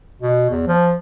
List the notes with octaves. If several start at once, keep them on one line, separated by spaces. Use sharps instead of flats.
B2
E2
F3